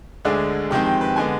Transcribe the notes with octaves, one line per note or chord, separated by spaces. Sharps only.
D2 D3 G#3 D4 G#4
F2 D#3 G#3 C4 G4
G4
B4
D3 G#3 B3 G#5